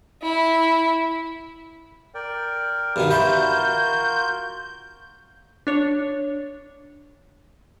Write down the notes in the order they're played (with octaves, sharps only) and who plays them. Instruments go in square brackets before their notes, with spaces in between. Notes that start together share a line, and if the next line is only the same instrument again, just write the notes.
[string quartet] E4
[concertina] A#4 D5 G5
[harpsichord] G2 B2 D#3
[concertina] F4 F#4 A#4 [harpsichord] B4 E5 [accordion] G6
[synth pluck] D4 C#5